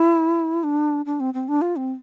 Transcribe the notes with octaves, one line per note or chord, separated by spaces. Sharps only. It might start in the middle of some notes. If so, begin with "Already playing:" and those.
Already playing: E4
D4
D4
C4
C4
D4
F4
C4